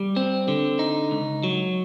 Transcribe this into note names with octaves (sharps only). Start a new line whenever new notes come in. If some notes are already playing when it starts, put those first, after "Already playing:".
Already playing: G3
C4
D3
D#4
C#2
F#3